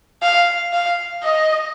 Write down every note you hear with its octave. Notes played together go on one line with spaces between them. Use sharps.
F5
F5
D#5